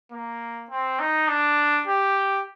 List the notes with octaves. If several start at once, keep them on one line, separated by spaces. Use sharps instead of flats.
A#3
C4
D#4
D4
G4